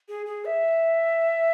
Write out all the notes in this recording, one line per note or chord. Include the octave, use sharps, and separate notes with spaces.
G#4
G#4
E5